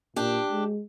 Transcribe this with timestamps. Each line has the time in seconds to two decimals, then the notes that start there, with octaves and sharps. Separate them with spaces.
0.16 A#2 D4 G4
0.52 G#3